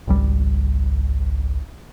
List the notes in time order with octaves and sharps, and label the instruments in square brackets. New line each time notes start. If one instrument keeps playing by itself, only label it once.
[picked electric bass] G#1 C#2 G3